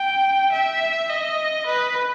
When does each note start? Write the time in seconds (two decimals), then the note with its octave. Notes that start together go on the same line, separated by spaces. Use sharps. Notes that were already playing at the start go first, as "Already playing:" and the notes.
Already playing: G5
0.52 E5
1.10 D#5
1.67 B4